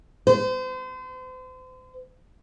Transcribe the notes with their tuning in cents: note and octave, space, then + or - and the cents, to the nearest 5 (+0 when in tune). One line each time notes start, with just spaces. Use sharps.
C5 -35